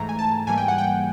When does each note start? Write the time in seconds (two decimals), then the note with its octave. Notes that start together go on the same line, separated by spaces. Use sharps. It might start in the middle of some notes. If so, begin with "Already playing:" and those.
Already playing: G#2 E3 A3 A#5
0.09 G#5
0.19 A5
0.47 G#2 E3 G3 A#3 G#5
0.58 G5
0.68 F#5
0.78 G5